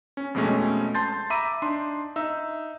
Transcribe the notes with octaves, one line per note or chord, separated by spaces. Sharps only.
C#4
F2 B2 G#3 A3 C#4
A5 C6 G6 A6
E5 A#5 B5 D6 E6 D#7
D4 D#4 C6
D#4 E5 E6